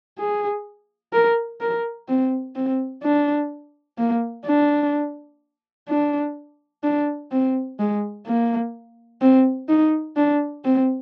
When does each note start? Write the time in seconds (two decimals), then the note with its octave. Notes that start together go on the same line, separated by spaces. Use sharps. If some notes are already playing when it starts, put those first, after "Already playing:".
0.18 G#4
1.13 A#4
1.60 A#4
2.09 C4
2.56 C4
3.03 D4
3.98 A#3
4.46 D4
5.89 D4
6.83 D4
7.31 C4
7.79 G#3
8.27 A#3
9.21 C4
9.69 D#4
10.17 D4
10.65 C4